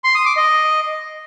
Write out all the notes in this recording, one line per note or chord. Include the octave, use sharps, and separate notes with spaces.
C6
D#6
D6
D#5